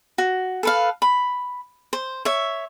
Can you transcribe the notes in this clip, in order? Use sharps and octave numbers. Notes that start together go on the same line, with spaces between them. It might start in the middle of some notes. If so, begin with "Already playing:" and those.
F#4
A4 B4 F5
B5
C5
C#5 E5